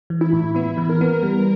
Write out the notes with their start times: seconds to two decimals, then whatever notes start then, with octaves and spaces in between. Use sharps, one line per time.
0.10 E3
0.21 E4
0.33 A2
0.55 B3 E4
0.77 E3
0.89 A#4
1.01 B3
1.23 G3